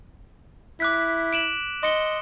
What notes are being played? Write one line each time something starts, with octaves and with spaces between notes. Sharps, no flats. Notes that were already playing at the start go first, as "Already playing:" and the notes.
E4 D6 F#6 B6
D7 E7 F#7
D#5 C6 C#7 G7